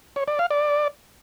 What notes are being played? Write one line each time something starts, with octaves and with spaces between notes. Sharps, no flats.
C#5
D5
F5
D5